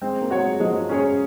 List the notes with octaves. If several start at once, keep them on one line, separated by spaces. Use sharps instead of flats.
G#3 C4
A#3
F#3 F#4 C#5
G#3
F3 G#3
F#3
F3
C#4 G#4 C#5
G#3